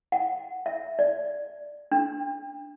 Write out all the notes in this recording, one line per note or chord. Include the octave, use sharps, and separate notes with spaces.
F#5
E5
D5
D4